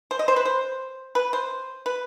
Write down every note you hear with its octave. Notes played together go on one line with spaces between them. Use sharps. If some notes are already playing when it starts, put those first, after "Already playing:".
C5
D#5
C5
B4
C5
B4
C5
B4